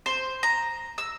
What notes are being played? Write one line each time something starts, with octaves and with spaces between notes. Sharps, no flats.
C5
A#5
E6